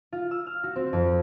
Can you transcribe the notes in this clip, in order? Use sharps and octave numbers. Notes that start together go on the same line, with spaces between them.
F4
E6
F6
F#4
C4
F2